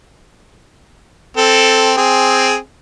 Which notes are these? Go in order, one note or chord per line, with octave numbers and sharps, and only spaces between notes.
C4 A4
C4 G#4